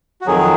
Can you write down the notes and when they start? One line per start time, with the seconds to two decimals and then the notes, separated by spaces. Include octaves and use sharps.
0.21 F#4
0.26 F2 D#3 F#3 G#4